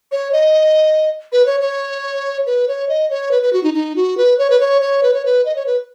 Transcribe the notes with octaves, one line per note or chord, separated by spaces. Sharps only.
C#5
D#5
B4
C#5
C#5
B4
C#5
D#5
C#5
B4
B4
F#4
D#4
D#4
F#4
B4
C#5
B4
C#5
C#5
B4
C#5
B4
D#5
C#5
B4